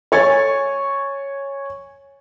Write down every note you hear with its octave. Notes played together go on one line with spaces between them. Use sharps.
C#5 G#5 C#6 A6